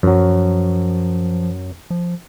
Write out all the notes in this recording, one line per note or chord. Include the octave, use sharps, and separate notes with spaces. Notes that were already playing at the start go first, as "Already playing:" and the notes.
F#2 F3 F#3
F3